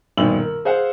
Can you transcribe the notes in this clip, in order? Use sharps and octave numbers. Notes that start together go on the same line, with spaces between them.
A#1 G2 B2 D#3 E6 F#7
A#4
G#4 C5 F5 F#5